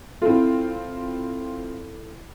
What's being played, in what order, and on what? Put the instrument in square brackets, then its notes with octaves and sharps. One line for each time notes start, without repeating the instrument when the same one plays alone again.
[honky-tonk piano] C4 F4 [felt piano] E4 A4